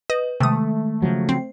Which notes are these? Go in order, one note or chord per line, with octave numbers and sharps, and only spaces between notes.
B4 D#5
C3 D#3 G#3 A3 D#6
C#3 F3 F#3
C4 C7